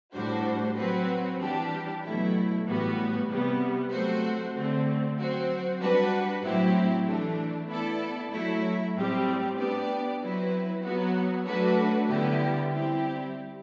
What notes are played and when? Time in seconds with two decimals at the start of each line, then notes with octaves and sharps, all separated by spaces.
0.14 A2 G3 D4 F#4 C5
0.77 F#3 C4 F#4 B4
1.40 E3 G3 D4 G4
2.03 B2 F#3 A3 E4
2.66 A2 E3 G3 B3 F#4
3.29 C3 G3 B3
3.92 F#3 A3 C4 F#4 C5
4.54 D3 A3 C4
5.17 F#3 C4 F#4 C5
5.80 G3 D4 F#4 B4
6.43 A2 F#3 C4 E4 G4
7.06 E3 A3 D4
7.69 B3 E4 A4 D5
8.32 F#3 A3 E4
8.94 A2 G3 C4 G4
9.58 B3 D4 G4 D5
10.21 F#3 C4 E4 B4
10.83 F#3 B3 F#4
11.46 F#3 A3 D4 F#4 B4
12.09 D3 G3 B3 E4 G4
12.72 G3 C4 E4 G4